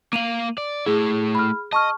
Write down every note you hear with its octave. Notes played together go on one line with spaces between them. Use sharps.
A#3 F5 D#7 F7 F#7
D5
A3 E4 G#4
B5 F6
D#5 A5 C#6 F6